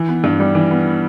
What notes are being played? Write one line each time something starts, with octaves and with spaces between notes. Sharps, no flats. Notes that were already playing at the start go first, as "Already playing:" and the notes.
Already playing: E3
B3
G2
G3
E3
B3